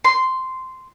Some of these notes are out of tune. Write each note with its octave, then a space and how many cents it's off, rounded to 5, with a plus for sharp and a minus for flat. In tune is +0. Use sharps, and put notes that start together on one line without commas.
C6 -10